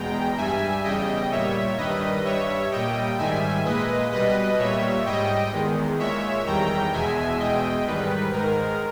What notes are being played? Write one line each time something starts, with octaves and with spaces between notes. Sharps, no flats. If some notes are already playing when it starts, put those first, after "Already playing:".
Already playing: E2 B2 G#3 G5 A#5
G2 G3 E5 G#5
E2 C#3 G3 D#5 G5
A#2 G3 C#5 E5
G2 D#3 G3 B4 D#5
G2 G3 C#5 E5
A#2 G3 D#5 G5
G#2 D#3 G3 E5 G#5
A#2 G#3 B4 D#5
B2 G3 B4 D#5
A#2 G3 C#5 E5
G#2 G3 D#5 G5
E2 D#3 G#3
A#2 G#3 C#5 E5
E2 D#3 G3 G5 A#5
E2 B2 G#3 E5 G#5
E2 B2 G#3 D#5 G5
G#2 D#3 G3 B4
G#2 D#3 G#3 A#4